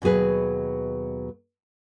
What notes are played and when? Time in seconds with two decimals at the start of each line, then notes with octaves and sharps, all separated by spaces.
0.02 D#2 B2 F#3 G#4 B4